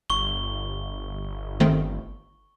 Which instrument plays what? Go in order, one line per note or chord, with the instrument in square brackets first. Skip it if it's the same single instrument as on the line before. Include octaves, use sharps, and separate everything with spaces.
[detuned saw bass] G1 [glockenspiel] C#6 G7
[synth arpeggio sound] D#3 A3 C4